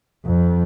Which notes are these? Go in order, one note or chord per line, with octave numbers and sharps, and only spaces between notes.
F2